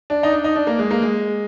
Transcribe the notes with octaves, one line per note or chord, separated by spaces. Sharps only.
D4
D#4
D4
D#4
D4
A#3
G#3
A#3
G#3